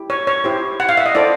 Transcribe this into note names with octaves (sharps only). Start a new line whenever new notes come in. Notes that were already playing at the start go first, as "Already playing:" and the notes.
Already playing: E4 G4
C#5
C#5
E4 G4 C5
F#5
F5
E5
D#5
E4 A4 C5 D5